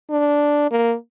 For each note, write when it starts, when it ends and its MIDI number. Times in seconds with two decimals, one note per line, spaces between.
0.10 0.69 62
0.71 0.95 58